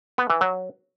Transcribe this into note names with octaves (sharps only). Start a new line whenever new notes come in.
B3
E3
F#3